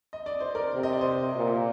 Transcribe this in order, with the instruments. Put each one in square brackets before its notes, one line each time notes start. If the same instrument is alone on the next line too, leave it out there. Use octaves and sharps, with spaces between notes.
[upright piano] D#5
D5
C5
A#4 D5
[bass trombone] C3
[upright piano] D#5
D5
C5 D#5
[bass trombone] A#2